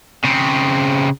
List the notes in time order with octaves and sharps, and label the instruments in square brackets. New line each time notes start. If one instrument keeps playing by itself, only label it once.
[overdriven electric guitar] C#3 C4